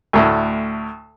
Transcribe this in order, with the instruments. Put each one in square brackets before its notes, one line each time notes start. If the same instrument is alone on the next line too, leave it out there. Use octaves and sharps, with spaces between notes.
[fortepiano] D2 A2